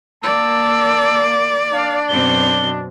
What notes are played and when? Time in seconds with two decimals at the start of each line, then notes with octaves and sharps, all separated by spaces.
0.23 A#3 D5 A5 E6
1.73 D4 F5
2.09 F#2 B2 C4 G7